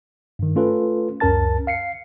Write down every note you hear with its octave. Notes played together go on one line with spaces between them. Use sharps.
G2 D#3
A3 C#4 F4 A4 B4
C#2 F#2 C#4 A#4 A5 A6
F5 C7 C#7